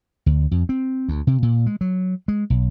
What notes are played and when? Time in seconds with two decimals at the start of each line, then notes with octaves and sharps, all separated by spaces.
0.26 D2
0.51 F2
0.69 C4
1.08 D2
1.27 C3
1.42 A#2
1.66 G#3
1.81 F#3
2.28 G#3
2.50 B1